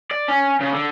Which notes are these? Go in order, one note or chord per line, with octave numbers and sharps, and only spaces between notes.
D5
C#4
C#3
D3